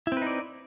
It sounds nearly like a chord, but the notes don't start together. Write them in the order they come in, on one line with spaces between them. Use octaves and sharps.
E4 C4 B4 D#4 D5